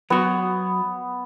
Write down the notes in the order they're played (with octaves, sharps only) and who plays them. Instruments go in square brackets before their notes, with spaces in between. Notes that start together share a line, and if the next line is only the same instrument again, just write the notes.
[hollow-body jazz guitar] F#3 F#4 [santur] B3